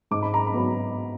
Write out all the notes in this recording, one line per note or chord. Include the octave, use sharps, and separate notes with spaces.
G#2 D6
B5
A#5
B5
F#3 B3